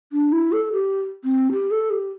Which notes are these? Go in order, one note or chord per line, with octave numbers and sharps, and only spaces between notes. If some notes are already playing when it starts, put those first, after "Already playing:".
D4
E4
A4
G4
C4
G4
A4
G4